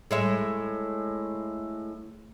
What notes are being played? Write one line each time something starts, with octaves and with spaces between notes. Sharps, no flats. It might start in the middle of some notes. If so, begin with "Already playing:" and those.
A2 G#3 E5